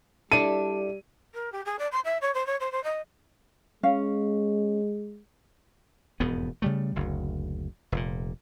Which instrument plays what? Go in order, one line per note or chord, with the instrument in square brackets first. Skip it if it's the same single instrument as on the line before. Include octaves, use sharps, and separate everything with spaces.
[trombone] G3 [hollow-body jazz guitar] D4 E4 A4 [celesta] A5 [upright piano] D#7
[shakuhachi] A#4
G4
G#4
D5
C6
E5
C#5
C5
C#5
C5
C5
D#5
[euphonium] G#3 [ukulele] C#4 F5
[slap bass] E1 F2 G#2 B3
C#3 G3 A3
F#1 D2
F1 A#2